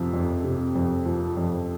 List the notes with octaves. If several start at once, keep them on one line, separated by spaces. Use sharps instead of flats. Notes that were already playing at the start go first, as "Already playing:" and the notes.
Already playing: F2 C3 F3
F2
C3
F2
F3
F2